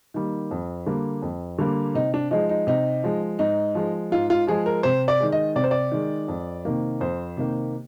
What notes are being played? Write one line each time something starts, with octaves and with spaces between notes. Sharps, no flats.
D#3 G3 A#3
F2
D3 G3 A#3
F2
D3 G3 A#3
C3 D#4
D4
F3 G#3 D#4
D#4
C3 D#4
F3 G#3
G#2 D#4
F3 G#3
G#2 F4
F4
F3 G#3 G#4
A#4
C3 C5
D5
D#3 G#3
D#5
C3 D5
C5
D5
D#3 G#3
F2
C3 D#3 A#3
F2 C5
C3 D#3 A#3